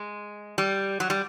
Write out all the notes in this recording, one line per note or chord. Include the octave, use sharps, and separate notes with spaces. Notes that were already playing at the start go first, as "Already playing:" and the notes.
Already playing: G#3
G3
F#3
G3